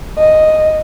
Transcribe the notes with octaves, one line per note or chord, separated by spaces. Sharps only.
D#5